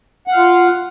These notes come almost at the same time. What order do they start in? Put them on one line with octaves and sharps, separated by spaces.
F#5 F5 F4